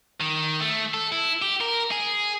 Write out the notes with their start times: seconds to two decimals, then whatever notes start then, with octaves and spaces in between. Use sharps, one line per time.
0.21 D#3
0.62 A3
0.94 A4
1.12 E4
1.42 G4
1.61 A#4
1.92 G#4